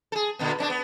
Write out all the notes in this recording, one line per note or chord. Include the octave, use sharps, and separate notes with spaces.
G#4 A4
A#2 D3 B3
B2 C#4 D4
B3